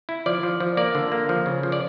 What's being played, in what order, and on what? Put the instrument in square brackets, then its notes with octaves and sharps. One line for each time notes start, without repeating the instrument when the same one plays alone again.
[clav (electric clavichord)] E4
F3 D5
F3
F3
A#3 D5
D3
A#3
F3
C#3
F3
D5